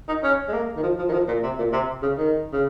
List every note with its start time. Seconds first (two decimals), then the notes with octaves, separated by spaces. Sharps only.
0.08 D#4
0.23 C#4
0.48 G#3
0.53 A#3
0.77 D#3
0.83 F3
0.98 F3
1.09 D#3
1.13 F3
1.28 A#2
1.43 C3
1.59 A#2
1.73 C3
2.03 C#3
2.18 D#3
2.53 C#3